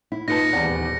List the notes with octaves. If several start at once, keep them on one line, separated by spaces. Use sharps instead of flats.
E4
A#2 D#4 B4 A5 A#6 C#7
D#1 E2 D5 F#5